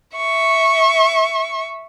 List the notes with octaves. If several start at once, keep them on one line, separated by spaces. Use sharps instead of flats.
E5 C#6